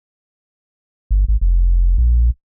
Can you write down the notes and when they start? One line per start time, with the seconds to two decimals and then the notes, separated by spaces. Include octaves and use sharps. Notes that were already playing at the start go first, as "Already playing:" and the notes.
1.11 G1
1.28 G#1
1.41 F1
1.98 A#1